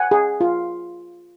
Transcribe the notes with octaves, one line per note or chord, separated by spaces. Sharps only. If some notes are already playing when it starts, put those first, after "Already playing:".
Already playing: F#5 G#5
G#4
F4